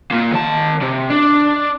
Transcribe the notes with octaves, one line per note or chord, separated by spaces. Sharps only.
A#3 F4
D#3 A5
C3
D4